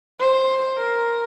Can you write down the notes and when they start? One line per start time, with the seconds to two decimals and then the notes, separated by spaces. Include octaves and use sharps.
0.19 C5
0.78 A#4